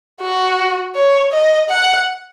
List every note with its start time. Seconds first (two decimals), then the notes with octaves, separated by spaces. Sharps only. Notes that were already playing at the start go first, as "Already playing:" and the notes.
0.21 F#4
0.95 C#5
1.32 D#5
1.70 F#5